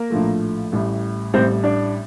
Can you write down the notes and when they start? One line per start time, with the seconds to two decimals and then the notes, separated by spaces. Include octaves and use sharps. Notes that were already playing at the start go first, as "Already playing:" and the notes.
Already playing: A#3 A#4
0.10 A#1 A2 F3 A3
0.72 A1 A2 G3
1.34 A1 A2 G3 C4 C5
1.64 D4 D5